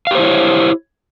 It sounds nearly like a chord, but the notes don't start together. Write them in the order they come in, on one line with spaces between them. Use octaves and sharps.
F5 G4 C5 E4 C#5